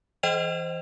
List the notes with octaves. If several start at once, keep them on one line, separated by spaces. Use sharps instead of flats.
E3 C5 D#5 G5 E7 F7